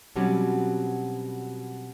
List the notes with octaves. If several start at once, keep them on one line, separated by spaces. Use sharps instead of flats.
B2 F#3 G3 C4 C#4